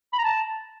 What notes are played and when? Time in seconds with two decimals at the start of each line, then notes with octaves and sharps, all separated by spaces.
0.13 B5
0.18 A#5
0.24 A5